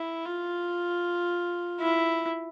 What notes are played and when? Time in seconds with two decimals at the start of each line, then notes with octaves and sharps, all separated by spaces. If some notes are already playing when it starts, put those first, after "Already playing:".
Already playing: E4
0.25 F4
1.81 E4